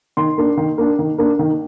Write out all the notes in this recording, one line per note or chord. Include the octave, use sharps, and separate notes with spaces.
D#3 C6
A#3 D4
D#3
A#3 D4
D#3
A#3 D4
D#3